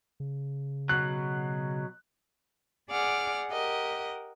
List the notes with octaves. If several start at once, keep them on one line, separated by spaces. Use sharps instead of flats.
C#3
B2 F#3 F#6
G#4 D5 F#5 D6 F6
G4 A#4 D#5 F#5